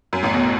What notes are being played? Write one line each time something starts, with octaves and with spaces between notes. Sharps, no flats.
F#2
A1 A2
B1 B2